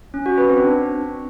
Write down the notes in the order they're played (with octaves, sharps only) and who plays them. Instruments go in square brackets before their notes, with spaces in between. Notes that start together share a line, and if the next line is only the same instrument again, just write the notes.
[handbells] C#4
F#4
B4
C4
D4